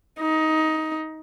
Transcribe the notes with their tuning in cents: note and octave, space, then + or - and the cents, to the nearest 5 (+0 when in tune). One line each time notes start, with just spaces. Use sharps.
D#4 +15